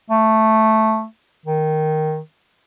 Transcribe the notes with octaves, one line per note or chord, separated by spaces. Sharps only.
A3
D#3